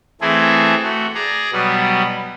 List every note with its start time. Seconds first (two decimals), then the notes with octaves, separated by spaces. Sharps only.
0.21 E3 A3 C4 E4 G#4 A4
0.83 A3 F#4
1.15 G#4 D5 A#5
1.52 B2 F#3 G3 B3